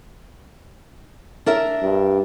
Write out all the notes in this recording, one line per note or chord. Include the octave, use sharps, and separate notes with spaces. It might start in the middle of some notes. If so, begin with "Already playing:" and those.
D4 A#4 E5
G2